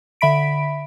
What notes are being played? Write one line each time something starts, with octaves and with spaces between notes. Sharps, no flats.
D3 E5 B5 B6 D7